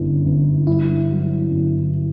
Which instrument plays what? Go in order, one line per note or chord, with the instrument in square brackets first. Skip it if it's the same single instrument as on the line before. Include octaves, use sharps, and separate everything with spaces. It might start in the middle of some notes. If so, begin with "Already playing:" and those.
Already playing: [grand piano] G1 F#2 D3 [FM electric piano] D4 E4
[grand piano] G1
[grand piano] G2 [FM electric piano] E4
[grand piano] F#3
G1